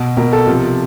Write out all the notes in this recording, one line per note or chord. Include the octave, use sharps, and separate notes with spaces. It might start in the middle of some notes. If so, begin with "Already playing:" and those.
Already playing: B2
B2 A#4
A4
C3 F3